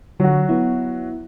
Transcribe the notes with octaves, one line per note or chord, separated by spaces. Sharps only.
D3 F#3 F#4
B3 E4